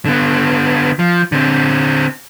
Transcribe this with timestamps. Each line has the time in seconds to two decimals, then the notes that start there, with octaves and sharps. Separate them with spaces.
0.06 D3 B3
0.99 F3
1.32 D3 C4